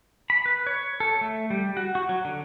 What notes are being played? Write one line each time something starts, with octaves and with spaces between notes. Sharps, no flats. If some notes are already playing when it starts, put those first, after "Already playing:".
B5
B4
C#5
A4
A3
G3
F#4
F#4
F#3
D3